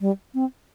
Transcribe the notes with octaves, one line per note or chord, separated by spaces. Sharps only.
G3
C4